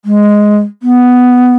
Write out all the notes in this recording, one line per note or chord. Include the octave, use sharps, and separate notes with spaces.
G#3
B3